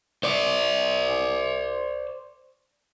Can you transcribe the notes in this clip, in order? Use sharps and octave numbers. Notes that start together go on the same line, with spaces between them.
C5 D5